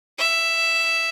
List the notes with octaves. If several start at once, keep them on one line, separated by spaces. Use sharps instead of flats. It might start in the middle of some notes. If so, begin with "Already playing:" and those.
E5